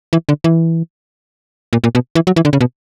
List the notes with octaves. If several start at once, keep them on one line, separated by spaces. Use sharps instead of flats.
E3
D3
E3
A#2
A#2
B2
E3
F#3
E3
D3
C#3
B2